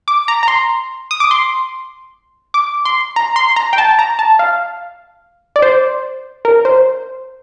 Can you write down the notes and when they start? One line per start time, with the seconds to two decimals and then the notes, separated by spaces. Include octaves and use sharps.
0.08 D6
0.28 A#5
0.43 A#5
0.48 C6
1.11 D#6
1.20 D6
1.31 C6
2.54 D6
2.85 C6
3.16 A#5
3.36 C6
3.56 A#5
3.73 G5
3.78 A5
3.99 A#5
4.19 A5
4.39 F5
5.56 D5
5.62 C5
6.45 A#4
6.65 C5